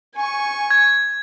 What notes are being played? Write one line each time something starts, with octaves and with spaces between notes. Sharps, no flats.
G#5 C#6
G#6